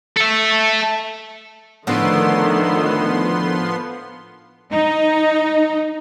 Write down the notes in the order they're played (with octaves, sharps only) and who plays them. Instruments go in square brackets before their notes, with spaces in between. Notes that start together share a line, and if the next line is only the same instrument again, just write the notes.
[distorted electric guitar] A4 E5
[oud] A2 D3 [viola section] D#3 A3 [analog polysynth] F3 B3 C6
[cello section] D#4